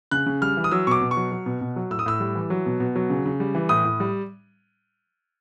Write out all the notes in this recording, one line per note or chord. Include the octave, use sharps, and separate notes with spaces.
C#3 F#6
C#3
G3 F6
E3
D#6
F#3 E6
B2 C#6 D6
B2
C#6
F#3
F#3
B2
B2
F#3
A2 E6
D#6
A2 E6
G3
E3
F#3
B2
B2
F#3
C#3
C#3
G3
E3
A2 D#6
A2
G3